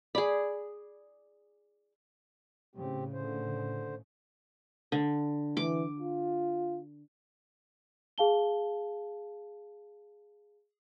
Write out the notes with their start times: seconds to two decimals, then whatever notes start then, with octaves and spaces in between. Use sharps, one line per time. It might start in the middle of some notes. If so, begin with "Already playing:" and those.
0.15 G#4 D5 B5
2.76 A2 C#3 C4 G4
3.13 D3 C5
4.92 D3
5.57 E3 D6
6.00 F4
8.18 G#4 F5 A5 G7